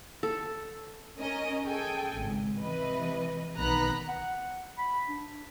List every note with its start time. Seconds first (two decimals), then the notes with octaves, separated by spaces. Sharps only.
0.23 A4
1.19 C#4 A#4 D#5
1.66 G#4 A4 G5 G#5
2.15 G#1 C#2
2.58 C3 E3 B4 D#5
3.58 B1 D#3 B3 A#5 B5 F#6
4.08 F#5
4.78 B5
5.08 D4